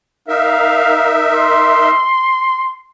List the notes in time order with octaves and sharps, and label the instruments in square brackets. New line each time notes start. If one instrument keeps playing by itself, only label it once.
[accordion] D#4 A#4 E5 [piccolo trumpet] F5
[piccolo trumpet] C6